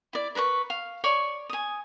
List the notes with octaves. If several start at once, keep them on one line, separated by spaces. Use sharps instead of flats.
E4 D5
A#4 B4 A#5 C#6
F5
C#5 D5 C#6
G#5 D#6